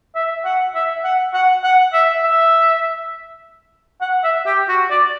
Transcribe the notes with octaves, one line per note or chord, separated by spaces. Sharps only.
E5
F#5
E5
F#5
F#5
F#5
E5
E5
F#5
E5
G4
F#4
D5